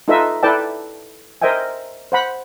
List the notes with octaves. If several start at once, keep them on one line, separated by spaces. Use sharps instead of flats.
D#4 F4 A4 B4 D#5 E5
E4 A4 B4 D5 G5 A5
A#4 C5 D#5 E5 G5 G#5
C5 F#5 B5